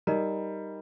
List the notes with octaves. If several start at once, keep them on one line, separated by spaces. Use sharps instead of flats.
G3 D#4 A#4 D#5 A#5